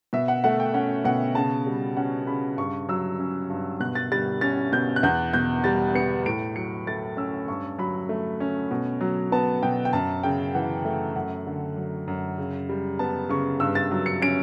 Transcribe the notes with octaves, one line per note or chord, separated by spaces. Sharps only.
B2 E5
F#5
A3 F#5
G5
C#4 F#5
B2 F#5
C#3 A5
G3
C#4 F#5
C#3 B5
G2 C#6
F#3 E6
C#4
G2
B2 F#6
A6
G3 A6
C#4 A6
B2 G6
F#6
E2 G6
B2 G6
G3 A6
B3 C#7
A2 D7
F#3 C#7
A3 A6
C#4 E6
G2 C#6
F#3 B5
A3
C#4
B2
F#3
B3 A5
B2 G5
G5
F#2 A5
C#3 G5
E3 F#5
A3 E5
F#2 F#5
D3
F#3
F#2
C#3
G3
B3 A5
C#3 C#6
G2 E6
A6
F#3
C#7
C#4 D7